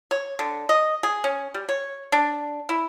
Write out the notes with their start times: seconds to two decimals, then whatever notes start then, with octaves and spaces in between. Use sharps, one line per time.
0.11 C#5
0.39 D3
0.69 D#5
1.03 G#4
1.24 C#4
1.54 G3
1.69 C#5
2.12 D4
2.69 E4